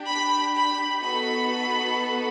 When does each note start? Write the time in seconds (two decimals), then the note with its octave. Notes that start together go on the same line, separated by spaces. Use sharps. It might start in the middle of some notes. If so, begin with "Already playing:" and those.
Already playing: D4 G4
0.10 B5
0.56 B5
1.01 B3 D#4 F#4 A4 B5